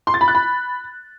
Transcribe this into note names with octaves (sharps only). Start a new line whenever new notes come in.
C6
A6
B5
F#6
B5